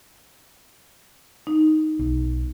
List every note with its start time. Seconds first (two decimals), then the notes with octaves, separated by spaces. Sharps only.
1.47 D#4
1.99 B1